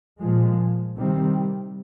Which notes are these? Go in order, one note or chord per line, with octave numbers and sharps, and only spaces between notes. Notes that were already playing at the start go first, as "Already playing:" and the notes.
A#2 F3 G#3
C3 D#3 G3 C4